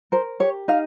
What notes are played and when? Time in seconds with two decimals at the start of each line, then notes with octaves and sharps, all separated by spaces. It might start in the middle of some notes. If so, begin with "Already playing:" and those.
0.12 A#4 C5
0.40 G4 C#5
0.68 D#4 F5